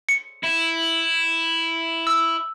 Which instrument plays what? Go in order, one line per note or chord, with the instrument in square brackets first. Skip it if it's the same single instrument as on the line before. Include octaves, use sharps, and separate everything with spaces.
[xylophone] C#7
[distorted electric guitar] E4
[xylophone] E6